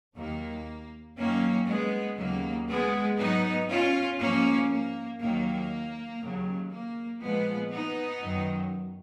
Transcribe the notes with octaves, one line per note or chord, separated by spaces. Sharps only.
D#2 D#3 F#3 A#3
F#2 D#3 F#3 A#3 C#4
G#3 B3
D#2 C#3 F#3 A#3
G#3 B3
G#2 F#3 B3 D#4
C#4 F4
G#2 F3 A#3 C#4
A#3
D#2 D#3 F#3 A#3
D#2 C#3 F#3
A#3
A#2 F3 G#3 B3
B3 D#4
F#2 D#3 F#3